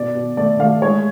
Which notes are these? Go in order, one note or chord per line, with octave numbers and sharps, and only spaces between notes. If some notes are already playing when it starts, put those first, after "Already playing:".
Already playing: B2 D5
B2
A3 D5
A3 F5
G#3 C#5